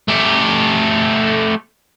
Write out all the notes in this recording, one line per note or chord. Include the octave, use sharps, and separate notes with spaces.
A3 G4